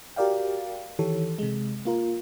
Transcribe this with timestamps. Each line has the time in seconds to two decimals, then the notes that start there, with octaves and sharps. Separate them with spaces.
0.16 F#4 G4 A#4 D5 F5 G5
0.99 D#3 E3 G4 A4 C#5
1.39 C3 G#3
1.85 A#3 F4 A#4